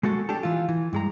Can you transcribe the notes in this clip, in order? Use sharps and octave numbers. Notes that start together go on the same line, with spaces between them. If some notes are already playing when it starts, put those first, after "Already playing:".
G#3 A3 F#4 A4
D4 G4 A4
E3 F4
E3
G2 G#3 A#5